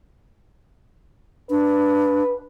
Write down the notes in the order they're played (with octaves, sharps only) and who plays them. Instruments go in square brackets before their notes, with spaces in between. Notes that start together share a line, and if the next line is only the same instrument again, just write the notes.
[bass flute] D4 [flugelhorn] B4